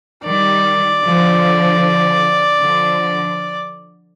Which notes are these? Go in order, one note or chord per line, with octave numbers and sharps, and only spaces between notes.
D#3 G3 D5
D3 F3
D3 F3